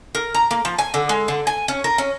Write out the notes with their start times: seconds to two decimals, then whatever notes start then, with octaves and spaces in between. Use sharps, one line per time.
0.15 A#4
0.35 A#5
0.51 A#3
0.65 F3
0.79 G#5
0.94 D3
1.09 G#3
1.28 D3
1.47 G#5
1.68 C#4
1.84 A#4
1.98 C#4